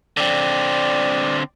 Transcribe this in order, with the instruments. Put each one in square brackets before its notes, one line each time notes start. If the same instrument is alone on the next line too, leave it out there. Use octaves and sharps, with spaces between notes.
[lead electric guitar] D3 C4 [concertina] D5